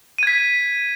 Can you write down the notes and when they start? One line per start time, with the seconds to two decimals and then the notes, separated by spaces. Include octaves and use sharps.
0.18 D#7
0.23 G#6
0.27 B6